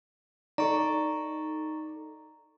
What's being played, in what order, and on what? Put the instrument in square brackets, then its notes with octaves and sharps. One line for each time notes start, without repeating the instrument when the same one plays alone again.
[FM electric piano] D#4 A4 [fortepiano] D5 [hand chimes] A#5 C#6